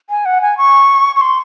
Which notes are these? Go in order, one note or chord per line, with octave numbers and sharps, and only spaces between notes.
G#5
F#5
G#5
C#6
C#6
C6